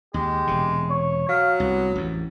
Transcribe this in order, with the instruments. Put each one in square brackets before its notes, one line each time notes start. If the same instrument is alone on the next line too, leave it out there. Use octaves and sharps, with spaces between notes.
[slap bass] D#2 [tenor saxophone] G#3 [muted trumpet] G4
[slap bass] E1 C3
[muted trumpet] C#5
[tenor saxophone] F#3 [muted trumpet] F5
[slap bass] C2 [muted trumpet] B3
[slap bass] A1 F2